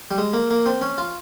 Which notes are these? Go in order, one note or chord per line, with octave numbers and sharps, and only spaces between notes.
G3
G#3
A#3
A#3
C4
C#4
F4